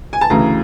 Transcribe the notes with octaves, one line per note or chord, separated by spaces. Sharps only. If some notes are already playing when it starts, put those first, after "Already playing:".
G#5
A5
D2 C#3 E3 A#5